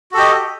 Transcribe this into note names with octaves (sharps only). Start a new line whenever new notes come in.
F#4 G4 A4 D#5